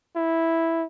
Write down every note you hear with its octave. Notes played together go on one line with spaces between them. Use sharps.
E4